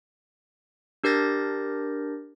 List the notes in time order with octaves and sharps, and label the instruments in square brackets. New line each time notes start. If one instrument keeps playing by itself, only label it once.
[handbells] D4 G4 A#4 G6 A6 A#6